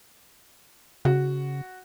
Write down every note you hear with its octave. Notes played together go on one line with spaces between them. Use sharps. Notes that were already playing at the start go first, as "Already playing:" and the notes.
C#3 F#4